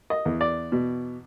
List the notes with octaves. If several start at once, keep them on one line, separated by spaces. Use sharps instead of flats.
D#5
E2
D5
B2